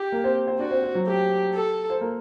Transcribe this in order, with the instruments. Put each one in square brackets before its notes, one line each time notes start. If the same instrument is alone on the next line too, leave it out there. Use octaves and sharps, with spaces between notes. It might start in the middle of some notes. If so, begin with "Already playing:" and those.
Already playing: [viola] G4
[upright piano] A#3 A#4
C4 C5
C4 C5
[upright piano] D4 D5 [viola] F#4
[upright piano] C4 C5
C4 C5
F#3 F#4
[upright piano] A3 A4 [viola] G4
[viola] A4
[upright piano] C5
A#3 A#4